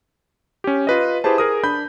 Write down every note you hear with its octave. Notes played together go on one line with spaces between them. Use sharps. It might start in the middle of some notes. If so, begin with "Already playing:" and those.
C#4 G4
F4 B4 D#5
E4 G4 G#4 B4 C5 A5
G#4 A#4 D#6
D4 B5 G6